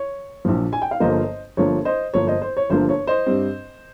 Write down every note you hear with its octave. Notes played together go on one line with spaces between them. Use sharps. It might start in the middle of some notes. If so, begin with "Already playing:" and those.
Already playing: C#5
A#1 A#2 F3
G#5
G5
F5
G1 G2 F3 A#3 C5 D#5
G1 G2 F3 A#3 C#5
C5 D#5
G1 G2 F3 A#3 C#5
C5 D#5
C5
C#5
G1 G2 F3 A#3 C5
C#5
C5 D#5
G2 G3 C4